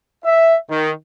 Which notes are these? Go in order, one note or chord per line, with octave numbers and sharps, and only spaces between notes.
E5
D#3